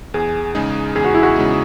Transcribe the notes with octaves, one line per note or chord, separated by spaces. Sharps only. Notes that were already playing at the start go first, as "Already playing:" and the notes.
E2 G#4
C#3 G#3 D#4 G#4
E2 G#4
F#4
E4
F#4
C#3 G#3 D#4 G#4